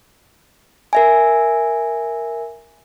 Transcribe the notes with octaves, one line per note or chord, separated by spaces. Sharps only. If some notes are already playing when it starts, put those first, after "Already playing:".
A#4 E5 G#5